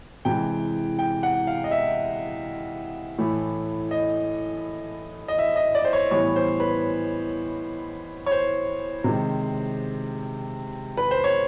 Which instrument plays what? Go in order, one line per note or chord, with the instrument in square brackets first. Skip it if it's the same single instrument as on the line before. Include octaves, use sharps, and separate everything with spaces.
[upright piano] C3 E3 G#3 G5
G5
F#5
F5
D#5
E5
A2 E3 A3
D#5
D#5
E5
D#5
D5
C5
C#5
A2 E3 G3 B3 C#5
C5
B4
C#5
C5
C3 D#3 G#3
B4
C5
C#5